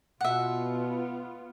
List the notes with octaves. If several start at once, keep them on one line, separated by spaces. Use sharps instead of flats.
B2 B3 F4 E5 F#5